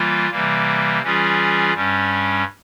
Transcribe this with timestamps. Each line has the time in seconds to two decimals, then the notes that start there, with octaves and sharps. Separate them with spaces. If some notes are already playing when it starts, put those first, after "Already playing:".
Already playing: E3 G3 A#3 F4
0.30 C3 E3 G3 A#3
1.03 E3 G3 C#4 F4 G#4
1.73 G2 G3 C#4